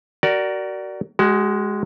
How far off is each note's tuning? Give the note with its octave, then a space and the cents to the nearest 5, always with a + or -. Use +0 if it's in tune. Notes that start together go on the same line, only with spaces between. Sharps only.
F#4 +30 A#4 +0 D5 +0
G#3 +0 F#4 +40